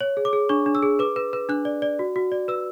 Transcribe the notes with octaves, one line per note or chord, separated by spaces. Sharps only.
C#5
G#4
D6
G#4
D4 C#6
D4
E6
G#4
B4 D6
B4
B4
D4 F#6
D5
D5
F#4
F#4
D5
B4 E6